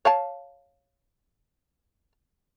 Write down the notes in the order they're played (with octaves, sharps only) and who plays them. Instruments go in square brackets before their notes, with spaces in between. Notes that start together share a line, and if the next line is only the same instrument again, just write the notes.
[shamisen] C#5 F5 A5